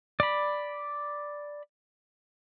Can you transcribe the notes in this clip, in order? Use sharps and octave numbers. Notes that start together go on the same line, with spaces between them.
D5 B5